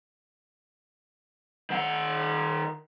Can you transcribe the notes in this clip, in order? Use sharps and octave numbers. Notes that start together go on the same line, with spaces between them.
D#3 F#5